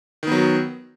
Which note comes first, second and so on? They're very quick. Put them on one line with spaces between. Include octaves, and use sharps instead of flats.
D#3 B3 F#3